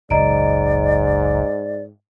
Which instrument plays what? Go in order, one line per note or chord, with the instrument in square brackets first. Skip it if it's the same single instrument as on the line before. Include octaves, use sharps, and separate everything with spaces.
[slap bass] F#1 C#2 [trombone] G#2 [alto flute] D5 [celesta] D#5 A#5 D7